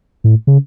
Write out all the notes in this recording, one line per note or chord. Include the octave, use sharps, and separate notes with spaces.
A2
C#3